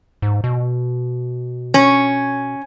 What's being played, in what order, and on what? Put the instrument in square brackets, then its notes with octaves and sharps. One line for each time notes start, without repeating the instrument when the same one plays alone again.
[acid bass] G#2
B2
[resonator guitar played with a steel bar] C#4